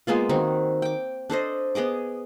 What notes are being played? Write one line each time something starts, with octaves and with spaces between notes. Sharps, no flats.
G#3 A#3 B3 F4
D#3 C4 D#4 F#4
G5 D6
D4 A4 C5 D#5
B3 G#4 D#5 D6